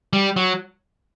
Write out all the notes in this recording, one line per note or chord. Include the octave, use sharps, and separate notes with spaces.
G3
F#3